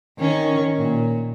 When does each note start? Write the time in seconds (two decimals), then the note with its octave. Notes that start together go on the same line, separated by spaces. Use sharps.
0.18 D#3 C#4 C#5
0.78 A#2